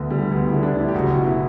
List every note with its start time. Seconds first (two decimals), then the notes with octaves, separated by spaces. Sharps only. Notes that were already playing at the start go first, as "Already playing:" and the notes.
Already playing: D2 D3 B3
0.11 D3 G3
0.32 D2 B3
0.47 E4
0.53 D3
0.63 D4
0.73 D2
0.79 E4
0.88 G4
0.94 F#1 F#4
1.10 F#4
1.15 B2
1.25 E4